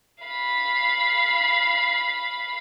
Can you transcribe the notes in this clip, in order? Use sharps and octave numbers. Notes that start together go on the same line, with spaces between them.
F5 B5